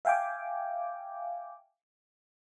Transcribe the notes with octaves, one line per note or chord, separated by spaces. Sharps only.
E5 F5 G5 G#5 D6